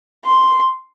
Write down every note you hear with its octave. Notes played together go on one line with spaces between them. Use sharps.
C6